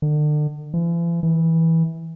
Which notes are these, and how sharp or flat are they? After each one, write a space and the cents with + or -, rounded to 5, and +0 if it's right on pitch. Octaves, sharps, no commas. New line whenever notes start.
D3 +40
E3 +45
E3 -15